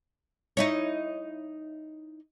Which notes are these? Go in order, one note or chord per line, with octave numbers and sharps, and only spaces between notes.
D#4 E4 C#5